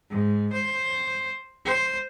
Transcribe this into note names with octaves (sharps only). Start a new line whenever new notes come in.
G#2
C5
C5